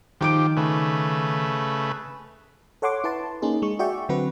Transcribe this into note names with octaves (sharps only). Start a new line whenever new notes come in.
D#3 F3 G4 D6 D7
C#3 A3 B4
A4 C#5 F#5 C6 D6
E4 B4 A5 C6
A#3 C#4 D#4 G#4
G#3 G#4 C#6
F#4 G#4 D5 E5 G5 C#6
D3 F#3 C4 F#4 B4